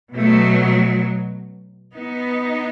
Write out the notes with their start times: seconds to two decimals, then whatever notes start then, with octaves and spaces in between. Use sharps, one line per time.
0.16 B2 F#3 A3
1.95 B3 D#4